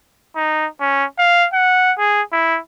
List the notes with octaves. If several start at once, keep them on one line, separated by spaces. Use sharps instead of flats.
D#4
C#4
F5
F#5
G#4
E4